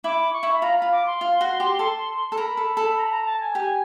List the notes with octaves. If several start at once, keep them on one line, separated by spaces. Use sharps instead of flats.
E4 D6
C#6
E4
B5
F4 A#5
B5
F4
D6
C6
F4
F#4
G4
A4
A4
A#4 B5
A4
A4
A#5
B5
A#5
A5
G#5
G4